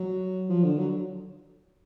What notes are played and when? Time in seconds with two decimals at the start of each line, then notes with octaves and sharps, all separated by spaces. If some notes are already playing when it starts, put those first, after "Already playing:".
Already playing: F#3
0.49 F3
0.64 D3
0.78 F#3